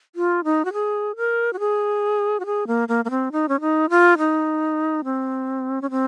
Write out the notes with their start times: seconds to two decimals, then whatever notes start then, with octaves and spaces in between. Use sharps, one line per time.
0.15 F4
0.44 D#4
0.65 F#4
0.73 G#4
1.16 A#4
1.53 F#4
1.59 G#4
2.40 F#4
2.46 G#4
2.67 A#3
2.88 A#3
3.05 A#3
3.10 C4
3.32 D#4
3.49 C#4
3.61 D#4
3.90 F4
4.18 D#4
5.04 C4
5.82 C#4
5.90 C4